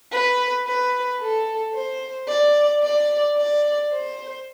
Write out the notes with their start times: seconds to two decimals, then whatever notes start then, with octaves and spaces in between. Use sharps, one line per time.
0.12 B4
0.66 B4
1.20 A4
1.74 C5
2.29 D5
2.83 D5
3.38 D5
3.92 C5